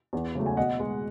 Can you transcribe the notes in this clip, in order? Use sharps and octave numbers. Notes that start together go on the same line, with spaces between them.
E2
C#3 F#3 A3
G#5
B2 D#5 F#5
G#3